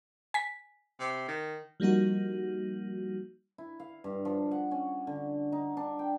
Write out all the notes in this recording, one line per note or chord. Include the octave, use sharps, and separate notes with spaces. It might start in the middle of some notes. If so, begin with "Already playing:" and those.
G#5 B6
C3
D#3
F3 G3 A#3 D#4 F#4
E4
F5
G2
F3
F#5
C#4
D3
D#4
D4
G5